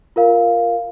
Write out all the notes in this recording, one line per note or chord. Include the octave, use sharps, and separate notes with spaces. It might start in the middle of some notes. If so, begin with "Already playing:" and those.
F4 A#4 F5